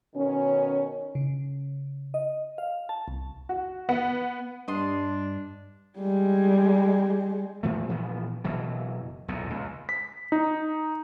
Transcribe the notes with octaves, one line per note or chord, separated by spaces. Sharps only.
B2 D#3 C#4
C#3
D#5
F5
A5
C2
F#4
B3
G2 D4 D#5 C6
G3 G#3
A#2 F3 A3
A#2 E3 F3 B3
F#1 B2 E3 F#3
B1 E2 A#2
C#2
B6
D#4